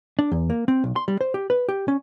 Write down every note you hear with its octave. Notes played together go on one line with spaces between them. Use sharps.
D4
E2
A#3
C4
B1
C6
G3
C5
G4
B4
G4
C#4